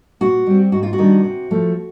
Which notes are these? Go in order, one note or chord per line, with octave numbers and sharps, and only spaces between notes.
A#2 F#4
G3 C4
G#2 F#4
F4
F#4
D#3 G3 B3 D4
C3
F3 A3